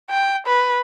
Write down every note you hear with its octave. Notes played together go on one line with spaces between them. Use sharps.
G5
B4